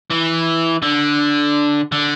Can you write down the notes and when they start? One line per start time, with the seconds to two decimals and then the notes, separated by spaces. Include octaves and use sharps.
0.10 E3
0.83 D3
1.92 D3